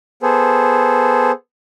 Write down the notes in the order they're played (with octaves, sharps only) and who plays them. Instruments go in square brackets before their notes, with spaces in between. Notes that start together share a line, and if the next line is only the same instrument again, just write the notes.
[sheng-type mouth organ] B3 G#4 A4 C5